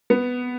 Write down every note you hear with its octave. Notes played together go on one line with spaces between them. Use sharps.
B3